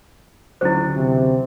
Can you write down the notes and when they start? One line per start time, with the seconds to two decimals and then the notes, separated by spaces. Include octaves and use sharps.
0.61 D2 C#3 F#3 E4 C5
0.96 C3